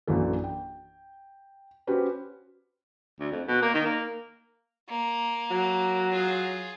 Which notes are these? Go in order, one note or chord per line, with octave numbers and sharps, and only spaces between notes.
A#1 F#2 E3 A4
G5
C#4 F#4 G4 B4 C5
D2
F2
B2
A#3
D#3
A#3
A#3
F#3
F4 G#4